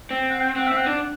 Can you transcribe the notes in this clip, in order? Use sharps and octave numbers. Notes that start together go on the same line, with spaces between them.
C4
F#5
G5
C4 F#5
C4 E5
F#5
D4